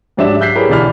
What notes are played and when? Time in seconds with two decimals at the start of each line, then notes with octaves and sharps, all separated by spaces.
0.17 G#2 F#3 D4 G4 E5 E7
0.40 E6 F#6 G6 B6 C7
0.55 E4 G4 G#4 A#4 B4 C#5
0.69 B1 D3 E3 D5 B5 F6